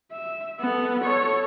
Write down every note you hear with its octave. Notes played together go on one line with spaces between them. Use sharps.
E5
B3 A4
A4 C#5